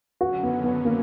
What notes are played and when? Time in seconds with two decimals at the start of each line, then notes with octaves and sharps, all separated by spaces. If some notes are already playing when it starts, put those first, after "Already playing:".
0.21 F#2 D3 F#3 C#4 F#4
0.43 B3
0.64 B3
0.85 A#3